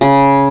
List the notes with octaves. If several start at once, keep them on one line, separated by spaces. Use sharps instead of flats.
C#3